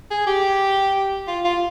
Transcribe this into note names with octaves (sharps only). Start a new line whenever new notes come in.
G#4
G4
F4
F4